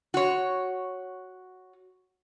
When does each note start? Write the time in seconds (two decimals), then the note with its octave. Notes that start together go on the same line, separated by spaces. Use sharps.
0.14 F#4 C#5